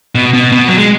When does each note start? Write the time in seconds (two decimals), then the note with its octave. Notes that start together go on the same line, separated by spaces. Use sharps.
0.15 B2
0.33 B2
0.52 B2
0.68 F#3
0.78 G#3